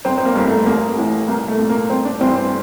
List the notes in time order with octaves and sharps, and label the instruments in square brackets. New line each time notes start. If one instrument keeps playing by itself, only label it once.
[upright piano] G1 C4
C4
A#3
G2 E3 A#3
A3
A1 A#3
A2 E3
C2 A#3
A3
A#2
A#3
G1 C4
D4
G2 E3 C4
C4